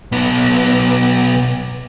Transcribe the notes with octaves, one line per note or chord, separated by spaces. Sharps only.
B1 B3